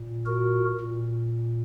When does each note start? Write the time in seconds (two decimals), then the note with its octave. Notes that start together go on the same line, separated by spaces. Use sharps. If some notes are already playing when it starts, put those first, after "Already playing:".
Already playing: A#2
0.26 F#4 A#4
0.81 A#2